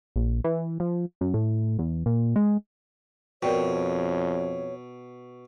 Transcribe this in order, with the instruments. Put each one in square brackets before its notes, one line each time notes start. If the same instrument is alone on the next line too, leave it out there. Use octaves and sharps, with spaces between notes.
[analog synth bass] A#1
E3
F3
F#2
A2
E2
A#2
G#3
[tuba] F2 [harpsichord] B2 [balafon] A#4 D5 G5 [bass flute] C#5